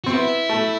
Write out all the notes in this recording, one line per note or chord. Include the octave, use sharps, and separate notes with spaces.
C4 F#4
B3 E4
A3